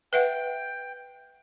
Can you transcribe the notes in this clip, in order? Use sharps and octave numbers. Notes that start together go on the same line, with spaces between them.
B4 E5 F#5 G5